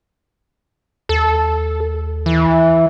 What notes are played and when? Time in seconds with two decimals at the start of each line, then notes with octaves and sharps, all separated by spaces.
1.09 D#2 A4
2.26 E3